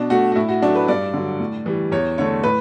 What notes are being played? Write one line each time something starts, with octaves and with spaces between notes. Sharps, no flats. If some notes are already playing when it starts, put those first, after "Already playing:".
Already playing: B2 D4
A3 F#4
F#4
A2 E4
F#4
F#3 A3 D4
B4
G2 D5
D3 F#3
A2
E3 G3
E2 C#5
D3 A3 C#5
A2 B4